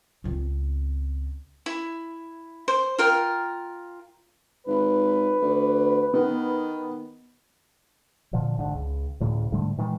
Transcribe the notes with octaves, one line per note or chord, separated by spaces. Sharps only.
C#2 C4
E4
C5
F4 A#4 G5
G#1 B4
D2
D#3 B3
A#2 D3 F3
G#1 D3
C#2
D2 A2 C#3
G#2 D3 G3 A3
A#2 D#3 E3 G#3